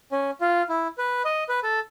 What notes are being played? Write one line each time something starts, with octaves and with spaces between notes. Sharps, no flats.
C#4
F4
E4
B4
D#5
B4
A4